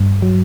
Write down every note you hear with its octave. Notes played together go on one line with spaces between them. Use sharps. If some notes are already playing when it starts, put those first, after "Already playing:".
Already playing: G2
F#3